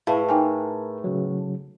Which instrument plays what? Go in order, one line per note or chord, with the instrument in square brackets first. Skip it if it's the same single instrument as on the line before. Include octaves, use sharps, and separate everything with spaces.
[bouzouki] A2 [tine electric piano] E4 [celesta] G#4 B4 E5 [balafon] F5
[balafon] D#4 G5 G#5 [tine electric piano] A#4
[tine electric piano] C#3 F#3